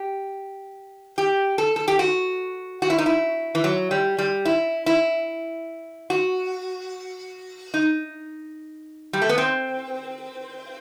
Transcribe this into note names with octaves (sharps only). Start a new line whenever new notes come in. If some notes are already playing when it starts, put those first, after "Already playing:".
Already playing: G4
G4
A4
A4
G4
F#4
F#4
E4
D#4
E4
E3
F#3
G3
G3
E4
E4
F#4
D#4
G3
A3
B3
C4